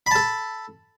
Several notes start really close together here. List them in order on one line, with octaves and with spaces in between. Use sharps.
B5 A5 A4